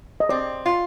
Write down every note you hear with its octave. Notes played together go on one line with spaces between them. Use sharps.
D#5
C4 D5
F4